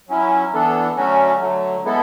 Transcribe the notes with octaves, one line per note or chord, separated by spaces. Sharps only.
F#3 C#4 E4
E3 B3 D4 A4
D3 F#3 A3 C#4 F#4
D3 F#3 A3
G#3 B3 E4 A4